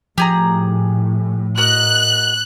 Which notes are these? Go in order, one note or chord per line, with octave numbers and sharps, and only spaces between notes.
A2 F3 G4 G#4 A#5
F#4 A#4 D#5 F#6